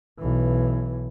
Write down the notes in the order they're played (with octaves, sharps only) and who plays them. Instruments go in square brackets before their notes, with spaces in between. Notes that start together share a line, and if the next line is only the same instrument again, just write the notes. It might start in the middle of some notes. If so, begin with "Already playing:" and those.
[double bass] B1 E3